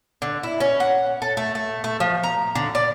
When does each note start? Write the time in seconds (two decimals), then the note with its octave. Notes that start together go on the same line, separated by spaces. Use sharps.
0.22 D3
0.43 E4
0.60 C#4
0.80 F#5
1.22 A4
1.37 A3
1.55 A3
1.84 A3
2.00 F3
2.23 A#5
2.55 D3
2.75 D5